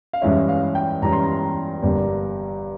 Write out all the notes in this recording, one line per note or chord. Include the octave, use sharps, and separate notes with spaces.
F5
G2 E3 G#3 C#4 E5
F5
G5
G2 E3 G#3 C#4 A#5
C6
A#5
G1 G2 G3 A#3